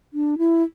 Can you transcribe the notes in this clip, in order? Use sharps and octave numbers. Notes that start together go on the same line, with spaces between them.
D4
E4